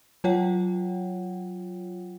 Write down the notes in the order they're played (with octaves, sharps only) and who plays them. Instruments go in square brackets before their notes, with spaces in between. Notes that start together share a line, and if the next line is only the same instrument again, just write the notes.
[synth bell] F#3 F4 C#5 F#5 G5